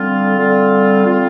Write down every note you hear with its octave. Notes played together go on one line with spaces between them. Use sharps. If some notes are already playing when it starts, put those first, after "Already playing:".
Already playing: D3 G3 C4 F4
D3 G3 C4 F4
D3 G3 C4 F4